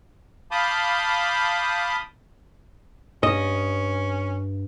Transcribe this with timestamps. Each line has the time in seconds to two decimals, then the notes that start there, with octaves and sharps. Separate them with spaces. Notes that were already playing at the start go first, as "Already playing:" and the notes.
0.51 F5 A5 B5 D6 D#6 G6
3.23 G2 C#4 D#5